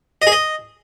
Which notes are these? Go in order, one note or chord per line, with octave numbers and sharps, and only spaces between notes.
D#5
G#4
D#5